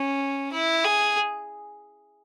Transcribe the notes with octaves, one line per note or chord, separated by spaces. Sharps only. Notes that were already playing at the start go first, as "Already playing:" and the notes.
Already playing: C#4
E4
G#4